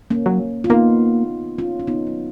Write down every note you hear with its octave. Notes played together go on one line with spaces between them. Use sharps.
A#3 C#4
F#3
F4
A#3 B3 D#4
C#4 F4
C#4
B3 D#4
F#3